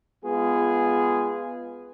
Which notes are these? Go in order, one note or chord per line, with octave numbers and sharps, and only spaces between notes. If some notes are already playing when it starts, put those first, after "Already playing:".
G#3 B3 F4 G#4